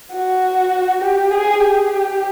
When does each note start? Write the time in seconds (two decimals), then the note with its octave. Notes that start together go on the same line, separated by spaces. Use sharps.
0.13 F#4
1.01 G4
1.31 G#4
1.60 G4